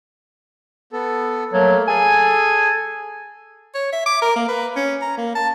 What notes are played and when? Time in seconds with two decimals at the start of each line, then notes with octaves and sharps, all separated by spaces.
0.93 B3 A4
1.53 F#3 A3 A#3
1.87 G#4 A4 G#5
3.75 C#5
3.92 E5
4.06 D6
4.22 A#4
4.36 A#3
4.48 B4
4.76 C#4
5.02 A#5
5.18 A#3
5.35 A5